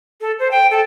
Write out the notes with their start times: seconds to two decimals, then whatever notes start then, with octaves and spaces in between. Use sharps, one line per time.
0.21 A4
0.39 C5
0.51 G5
0.71 A4